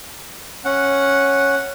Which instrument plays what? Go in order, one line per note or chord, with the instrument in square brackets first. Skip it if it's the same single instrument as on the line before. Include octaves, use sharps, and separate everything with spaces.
[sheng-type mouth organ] C#4 F#5